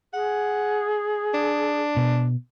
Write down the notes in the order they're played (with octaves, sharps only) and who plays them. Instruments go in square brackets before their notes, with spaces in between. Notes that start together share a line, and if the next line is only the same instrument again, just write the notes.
[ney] G#4 [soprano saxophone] F#5
[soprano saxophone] D4
[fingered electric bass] B2